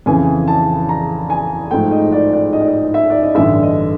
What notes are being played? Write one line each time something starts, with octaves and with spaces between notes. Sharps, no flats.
F2 C#3 E3 G#5
A5
A#5
G#5
G#2 F3 A3 G5
D#5
D5
D5
D#5
D5
D#5
E5
D5
D#5
A1 G2 D3 E5
D#5